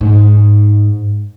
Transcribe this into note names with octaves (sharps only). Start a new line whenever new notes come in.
G#2